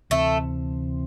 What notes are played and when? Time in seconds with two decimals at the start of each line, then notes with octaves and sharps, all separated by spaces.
0.10 D2 C3 E3 A3 C4